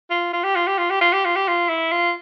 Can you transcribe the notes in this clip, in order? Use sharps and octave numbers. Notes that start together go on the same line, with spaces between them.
F4
F4
G4
F4
G4
F4
G4
F4
G4
F4
G4
F4
E4
F4